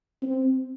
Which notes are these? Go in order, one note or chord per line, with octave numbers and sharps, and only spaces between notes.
C4